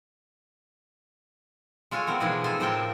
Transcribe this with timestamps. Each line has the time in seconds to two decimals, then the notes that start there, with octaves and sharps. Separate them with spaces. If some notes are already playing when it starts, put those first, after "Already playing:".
1.91 G#3 F4 A4 C#5 G#5
2.07 B3 C4 A#4
2.20 B2 E3 F3 G#3 D#4 G#4
2.44 C3 A4 C5 G#5
2.60 A2 F3 C4 A#4 G5 A5